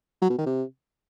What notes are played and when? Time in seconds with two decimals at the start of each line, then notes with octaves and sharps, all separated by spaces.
0.22 F#3
0.30 B2
0.38 D#3
0.46 C3